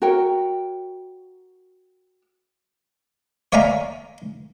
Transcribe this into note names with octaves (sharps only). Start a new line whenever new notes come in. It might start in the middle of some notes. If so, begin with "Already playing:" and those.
F#4 A#4 C#5 G5
C#5 D5 E5 F5 G#5 A#5